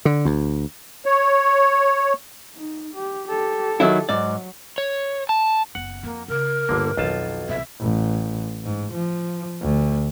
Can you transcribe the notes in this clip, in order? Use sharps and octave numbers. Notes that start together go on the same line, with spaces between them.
D3
D2
C#5
D#4
G4
G4 A4
D#3 F#3 E4
G#2 F#3 D5
C#5
A5
F#1 B3 F#5
F2 A#3
C#3 A#4
G1 D2 G2 D3 A#3
B1 F2 D#3 F4 A5
C2 E3 E5
A1
G#2
F3
D2